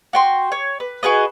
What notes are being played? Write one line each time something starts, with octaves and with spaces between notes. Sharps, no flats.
F#4 G5 C6
C#5
B4
F#4 G#4 B4 D#5